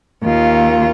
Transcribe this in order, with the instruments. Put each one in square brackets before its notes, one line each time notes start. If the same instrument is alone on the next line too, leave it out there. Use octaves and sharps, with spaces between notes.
[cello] D#2 F4